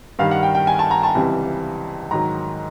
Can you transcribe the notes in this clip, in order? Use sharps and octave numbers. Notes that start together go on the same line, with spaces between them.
G2 D#3 G3 F5
F#5
G5
G5
G#5
A5
A#5
A5
C#2 C3 E3 G3
G#2 D#3 F#3 A#5